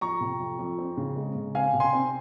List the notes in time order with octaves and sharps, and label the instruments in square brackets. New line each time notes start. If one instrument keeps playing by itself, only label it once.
[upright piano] F2 A#5 C#6
C3
F2
F2
C4
C#3
G#3
C#3
C4 F5 G#5
C3
G#5 C6
C4